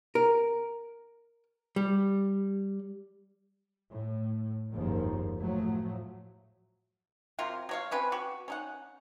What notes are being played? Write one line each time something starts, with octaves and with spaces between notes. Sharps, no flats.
A#4
G3
A2
F#1 D#2 G#2 D#3 F3
A2 F3 F#3 A3
C3 F#3 F4 A#4
F#3 C#5 F5
C4 C#4 B4
F#4 G4
C#4 D#4 F#5